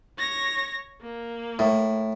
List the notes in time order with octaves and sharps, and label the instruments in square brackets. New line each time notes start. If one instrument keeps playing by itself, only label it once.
[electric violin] C#5 A#6
A#3
[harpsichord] A2